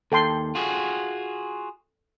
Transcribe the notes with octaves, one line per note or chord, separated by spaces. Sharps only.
D#2 A4 G5 C6
F4 F#4 G#4